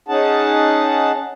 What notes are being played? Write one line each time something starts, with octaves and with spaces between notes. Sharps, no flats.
C#4 D#4 G#4 F#5 A5